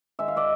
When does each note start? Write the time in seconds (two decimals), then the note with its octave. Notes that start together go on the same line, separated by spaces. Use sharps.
0.19 D#3 G#3 E5
0.28 F5
0.36 D5 E5